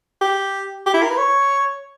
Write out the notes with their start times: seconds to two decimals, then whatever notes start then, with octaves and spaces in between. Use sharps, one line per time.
0.21 G4
0.87 G4
0.94 E4
1.03 A#4
1.10 B4
1.18 C#5